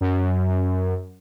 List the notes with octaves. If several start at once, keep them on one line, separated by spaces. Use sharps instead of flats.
F#2